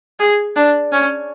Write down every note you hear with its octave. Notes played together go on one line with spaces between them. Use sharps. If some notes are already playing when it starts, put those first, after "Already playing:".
G#4
D4
C#4